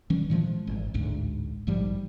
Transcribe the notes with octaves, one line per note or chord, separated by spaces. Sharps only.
D#3 E3 G3 C#4
A#2 E3 F3 G#3
G#1
A1 D2 G#2
A#1 G#2 F3 G3